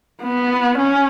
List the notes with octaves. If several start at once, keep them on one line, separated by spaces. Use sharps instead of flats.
B3
C#4